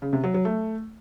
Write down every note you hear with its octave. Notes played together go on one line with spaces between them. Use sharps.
C#3
C3
F#3
F#3
A3